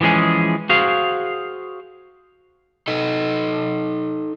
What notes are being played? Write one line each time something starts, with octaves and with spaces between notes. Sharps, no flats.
E3 F3 G#3 C#4 G#4
F#4 G#4 C5 F5
D#4 A4 D#5